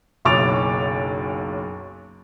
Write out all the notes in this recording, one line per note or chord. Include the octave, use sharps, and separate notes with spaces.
F#1 B1 C#5 D6 A6 F7